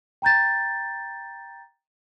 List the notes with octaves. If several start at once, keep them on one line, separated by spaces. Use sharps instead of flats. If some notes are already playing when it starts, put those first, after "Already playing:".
G5 A#5 G6 A6